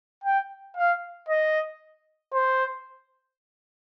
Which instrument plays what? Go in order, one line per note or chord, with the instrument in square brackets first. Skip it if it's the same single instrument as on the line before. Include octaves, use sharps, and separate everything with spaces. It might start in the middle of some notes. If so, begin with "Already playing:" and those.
[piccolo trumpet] G5
F5
D#5
C5